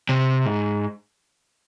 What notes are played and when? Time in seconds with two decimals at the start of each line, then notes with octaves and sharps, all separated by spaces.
0.09 C3
0.46 G#2